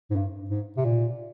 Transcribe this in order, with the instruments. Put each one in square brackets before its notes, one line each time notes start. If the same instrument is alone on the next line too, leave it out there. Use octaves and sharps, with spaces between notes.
[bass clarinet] G#2
G2
G#2
C3
A#2